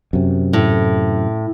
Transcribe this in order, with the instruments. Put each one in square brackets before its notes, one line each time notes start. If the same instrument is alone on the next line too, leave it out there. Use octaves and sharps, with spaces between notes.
[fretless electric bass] F#2 C3
[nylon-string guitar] A2